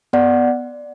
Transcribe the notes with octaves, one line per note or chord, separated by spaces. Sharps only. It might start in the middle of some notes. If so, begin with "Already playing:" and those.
B3 D5 F#5